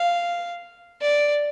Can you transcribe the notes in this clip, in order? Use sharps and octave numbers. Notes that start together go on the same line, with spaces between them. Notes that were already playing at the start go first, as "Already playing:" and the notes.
Already playing: F5
D5